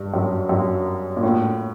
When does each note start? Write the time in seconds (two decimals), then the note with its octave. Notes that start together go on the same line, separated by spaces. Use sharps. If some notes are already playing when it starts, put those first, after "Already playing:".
Already playing: G2
0.14 F#2
0.49 F#2
1.17 A#2
1.23 A2